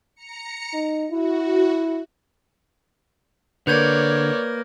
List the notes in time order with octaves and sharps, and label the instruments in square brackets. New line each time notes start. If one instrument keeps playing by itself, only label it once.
[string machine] A#5 C#7
[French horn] D#4
[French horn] E4 [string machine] F#4
[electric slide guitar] D3 [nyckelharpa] A#3 A#4 [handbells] B4 G6 G#6 [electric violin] C#5 D5